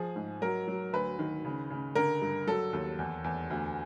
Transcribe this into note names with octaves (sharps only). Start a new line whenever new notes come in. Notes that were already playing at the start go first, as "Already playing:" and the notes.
Already playing: F3 G#4
G#2
F#3 A#4
F#3
D2 B4
D#3
C#3
C#3
D3 A#4
G2
F#3 A4
D#2
E2
E2
D2